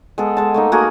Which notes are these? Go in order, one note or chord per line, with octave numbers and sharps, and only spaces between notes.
G#3 B3 A4
G#3 A5
A3 A#3 D#4
A#3 F#4 G#4 A#4